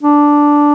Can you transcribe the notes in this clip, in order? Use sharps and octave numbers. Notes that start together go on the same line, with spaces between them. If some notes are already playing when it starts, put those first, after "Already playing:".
D4